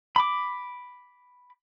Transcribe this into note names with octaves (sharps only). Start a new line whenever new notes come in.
B5 D6